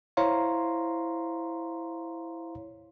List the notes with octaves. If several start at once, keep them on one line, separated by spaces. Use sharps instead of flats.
E4 C5 C#5 F5 A#5 C6